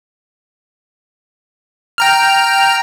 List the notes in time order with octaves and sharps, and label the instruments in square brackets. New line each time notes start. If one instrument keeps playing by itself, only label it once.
[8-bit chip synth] G5 A#5 F6